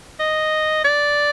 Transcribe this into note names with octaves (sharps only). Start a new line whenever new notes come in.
D#5
D5